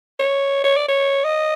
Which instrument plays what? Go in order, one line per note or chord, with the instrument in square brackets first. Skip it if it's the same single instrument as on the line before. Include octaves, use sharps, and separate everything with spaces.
[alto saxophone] C#5
C#5
D5
C#5
D#5